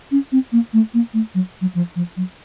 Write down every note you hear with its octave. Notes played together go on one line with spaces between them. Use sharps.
C#4
C4
A#3
A3
A#3
A3
F#3
F#3
F3
F3
F#3